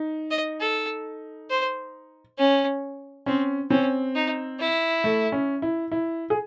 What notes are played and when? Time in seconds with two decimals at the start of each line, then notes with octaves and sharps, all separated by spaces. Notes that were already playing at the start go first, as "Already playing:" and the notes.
Already playing: D#4
0.31 D#5
0.61 A4
1.50 C5
2.38 C#4
3.26 C4 C#4
3.70 C4 C#4
4.15 D#4
4.59 E4
5.04 A3
5.32 C#4
5.62 E4
5.92 E4
6.30 G#4